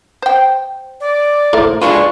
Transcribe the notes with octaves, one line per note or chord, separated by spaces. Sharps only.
C5 G5
D5
A2 A#3 A#4 C5
G#3 D4 F4 B4 C#6